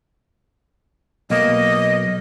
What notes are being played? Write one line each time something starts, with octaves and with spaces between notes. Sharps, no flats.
B1 A#3 D#5